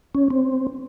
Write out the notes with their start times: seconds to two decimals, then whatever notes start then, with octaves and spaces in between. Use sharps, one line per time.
0.15 C#4
0.30 C4